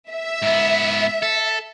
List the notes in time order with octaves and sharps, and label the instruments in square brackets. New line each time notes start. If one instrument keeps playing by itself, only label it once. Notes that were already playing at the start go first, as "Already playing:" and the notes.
[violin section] E5
[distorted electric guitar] G#2 B3
A4